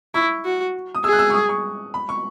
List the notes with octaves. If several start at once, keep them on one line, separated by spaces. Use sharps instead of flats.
E4 C#6
F#4
D#6
G#4 E6
F#6
E6
C#6
D#6
C#6
B5
C#6